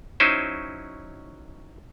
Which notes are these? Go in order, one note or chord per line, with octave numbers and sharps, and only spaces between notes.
F#3 C#4 D#4 E4 C5